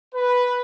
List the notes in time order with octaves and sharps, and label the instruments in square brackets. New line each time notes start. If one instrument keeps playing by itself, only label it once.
[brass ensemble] B4